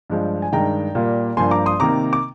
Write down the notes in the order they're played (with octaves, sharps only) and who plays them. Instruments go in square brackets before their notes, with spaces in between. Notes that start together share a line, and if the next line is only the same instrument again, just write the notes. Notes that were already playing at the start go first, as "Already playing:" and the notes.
[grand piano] G2 F3 G#3
G#5
G2 D#3 G#3 G5 A#5
A#2 G3 A#3
G2 F3 A#3 G#5 C6
A#5 D6
C6 D#6
C3 D#3 A#3 A#5 D6
D6